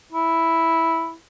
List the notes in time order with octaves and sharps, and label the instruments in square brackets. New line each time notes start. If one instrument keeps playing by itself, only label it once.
[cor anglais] E4